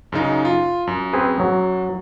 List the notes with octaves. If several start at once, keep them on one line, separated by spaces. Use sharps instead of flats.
F#2 C#3 D#4
F4
F#2
C4 G#4 B4
F#3